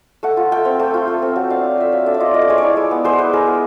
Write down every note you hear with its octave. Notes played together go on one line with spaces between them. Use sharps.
A3 F#5
F4
A3 G5
C4
A3
F4
A3
C4
F#3 F#5
D4 F5
F4
A3 E5
F#3 F5
D4 E5
D5
F4 D#5
A3 D#5
D5
G#3 C#5
D5
E4
G#3
B3
G#3 C5
E4 B4
G#3 A#4
B3